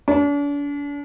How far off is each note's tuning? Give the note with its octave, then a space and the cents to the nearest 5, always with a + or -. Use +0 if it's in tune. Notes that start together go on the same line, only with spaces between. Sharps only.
D4 -40